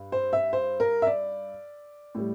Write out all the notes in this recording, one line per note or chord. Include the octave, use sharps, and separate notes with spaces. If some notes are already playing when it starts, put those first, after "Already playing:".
Already playing: G2
C5
E5
C5
A#4
E5
D5
A2 G3